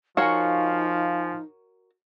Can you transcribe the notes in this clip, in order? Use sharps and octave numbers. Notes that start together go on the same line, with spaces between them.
F3 D#4 F#4 A#4 C#5 F5 G#5